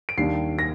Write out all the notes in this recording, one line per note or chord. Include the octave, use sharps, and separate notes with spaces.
D7
D#2 D#3 G3 D4 C7
A#6